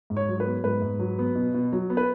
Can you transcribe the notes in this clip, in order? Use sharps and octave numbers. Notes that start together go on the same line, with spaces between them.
G#2
C#5
F#3
B4
B3
G#2 B4
G#2
F#3
B3
B2
B2
F#3
B3
B4